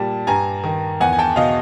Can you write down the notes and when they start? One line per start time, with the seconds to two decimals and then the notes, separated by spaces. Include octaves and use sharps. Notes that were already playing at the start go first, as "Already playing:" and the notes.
Already playing: A#2 G3 A5
0.27 G2 G#5 A#5
0.64 D#3
1.00 E2 F#5 G#5
1.13 G#5
1.19 G5 A5
1.36 B2 D#5 F5